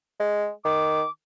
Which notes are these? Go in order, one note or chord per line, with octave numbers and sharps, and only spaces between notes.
G#3
D#3 D6